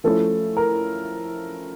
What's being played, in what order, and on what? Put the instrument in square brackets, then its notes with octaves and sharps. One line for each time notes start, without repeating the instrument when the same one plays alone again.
[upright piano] F3 A3 C#4 E4 A4
A#4